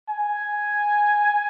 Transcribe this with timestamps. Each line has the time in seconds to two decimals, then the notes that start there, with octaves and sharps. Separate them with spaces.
0.09 G#5